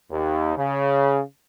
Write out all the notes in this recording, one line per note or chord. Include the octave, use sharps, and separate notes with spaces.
D#2
C#3